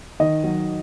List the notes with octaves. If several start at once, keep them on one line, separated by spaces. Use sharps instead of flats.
D#3 D#5
F#3